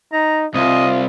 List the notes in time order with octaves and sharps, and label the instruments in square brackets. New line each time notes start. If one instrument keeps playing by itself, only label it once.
[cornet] D#4 [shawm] A#5
[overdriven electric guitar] C2 [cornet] F4 [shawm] D#5